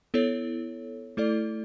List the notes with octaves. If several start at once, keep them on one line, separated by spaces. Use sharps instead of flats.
B3 E4 A4 C#5
A3 E4 A4 D5